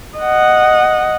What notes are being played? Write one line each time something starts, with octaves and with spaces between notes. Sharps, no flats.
D#5 F#5